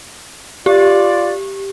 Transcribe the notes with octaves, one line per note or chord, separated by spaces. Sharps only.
F4 G4 D5